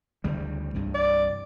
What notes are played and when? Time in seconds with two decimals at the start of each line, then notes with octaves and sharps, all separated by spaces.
0.24 D2 C#3 G3
0.74 C2 G2
0.95 D5